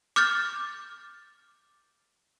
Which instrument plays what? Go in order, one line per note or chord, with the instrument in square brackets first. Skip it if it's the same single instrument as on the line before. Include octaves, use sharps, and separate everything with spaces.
[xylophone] D6 F6 G6 A6